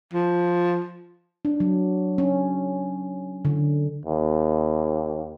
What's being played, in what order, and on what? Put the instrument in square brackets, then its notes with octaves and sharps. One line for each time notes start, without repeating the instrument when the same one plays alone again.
[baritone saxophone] F3
[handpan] D4
F#3
C#4
D3
[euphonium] D#2